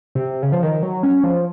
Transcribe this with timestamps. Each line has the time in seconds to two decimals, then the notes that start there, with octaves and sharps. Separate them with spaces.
0.15 C3
0.43 C#3
0.52 F3
0.63 D#3
0.82 F#3
1.03 C#4
1.24 F3